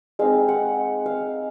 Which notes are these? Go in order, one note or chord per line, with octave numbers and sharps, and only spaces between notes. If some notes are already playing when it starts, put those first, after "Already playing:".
G#3 C4 D#4 F5
F#5
F5